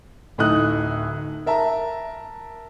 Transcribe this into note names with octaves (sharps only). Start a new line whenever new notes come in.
D1 A2 A3 D#4 D#6 F#6
A#4 E5 A5 A#5